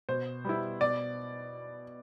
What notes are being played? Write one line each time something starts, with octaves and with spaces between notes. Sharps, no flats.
B2 C5
G3 B3 E4
B2 D5